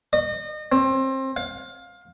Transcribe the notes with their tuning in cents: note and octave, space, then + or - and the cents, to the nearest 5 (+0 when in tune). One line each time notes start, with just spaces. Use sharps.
D#5 -35
C4 +25
F5 +20